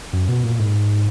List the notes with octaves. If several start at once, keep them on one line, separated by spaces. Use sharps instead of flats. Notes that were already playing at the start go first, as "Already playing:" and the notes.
F#2
B2
A#2
G#2